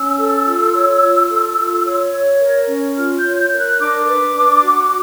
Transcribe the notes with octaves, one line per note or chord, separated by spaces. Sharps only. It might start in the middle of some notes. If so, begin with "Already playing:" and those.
Already playing: C#4 E6
A4
F4
C#5
F4
A4
F4
C#5
C#5
A#4
C#4
F4 F6
G6
C#5
G6
A#4 G6
F#6
D4 D6
B4
D4
F#4